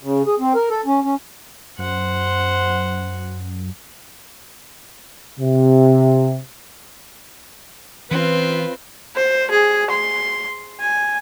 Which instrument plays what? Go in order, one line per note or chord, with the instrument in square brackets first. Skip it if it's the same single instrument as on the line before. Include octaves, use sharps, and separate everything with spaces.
[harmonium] C#3
G#4
C4
A#4
A4
C#4
C#4
[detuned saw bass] F#2 [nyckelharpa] C5 F#5
[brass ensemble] C3
[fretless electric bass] E3 C#4 [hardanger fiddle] C4 [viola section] F4 B4
[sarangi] C5
G#4
C6
G#5